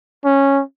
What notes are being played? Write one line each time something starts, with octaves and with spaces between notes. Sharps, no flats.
C#4